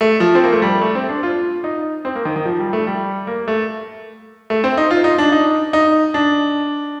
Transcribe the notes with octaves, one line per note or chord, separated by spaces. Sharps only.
A3
F3
C4
A#3
A3
G3
A3
C4
D4
F4
D#4
C4
A#3
D#3
D#3
F3
G3
A3
G3
A#3
A3
A3
C4
D#4
F4
D#4
D4
D#4
D#4
D4